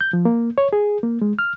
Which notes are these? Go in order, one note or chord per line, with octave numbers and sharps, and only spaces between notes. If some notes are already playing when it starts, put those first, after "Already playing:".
G6
F3
A#3
C#5
G#4
A#3
G#3
F6